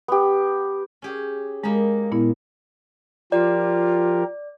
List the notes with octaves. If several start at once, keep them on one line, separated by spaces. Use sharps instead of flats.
B3 G4
C#4 G4 G#4
G#3 A#3 D#4 B5
A#2 B3 E4
F3 F4 G4 A#4 D5